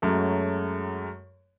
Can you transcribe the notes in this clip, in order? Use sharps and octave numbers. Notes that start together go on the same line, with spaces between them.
F#2 F#3 G#3 A3